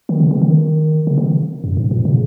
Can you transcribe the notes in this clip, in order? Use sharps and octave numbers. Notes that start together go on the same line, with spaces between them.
D#3
C#3
D#3
D#3
C#3
D#3
F#2
G#2
A#2
C#3